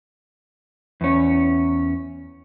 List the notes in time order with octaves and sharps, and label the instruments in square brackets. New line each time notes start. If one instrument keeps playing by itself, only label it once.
[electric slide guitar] E2 C#4